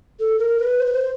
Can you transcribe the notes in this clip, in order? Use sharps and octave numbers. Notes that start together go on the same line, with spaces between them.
A4
A#4
B4
C5
B4
C5